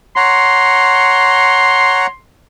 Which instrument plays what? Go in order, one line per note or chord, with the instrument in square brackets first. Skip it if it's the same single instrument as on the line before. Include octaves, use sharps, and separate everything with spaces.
[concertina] C#5 F#5 A#5 [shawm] C6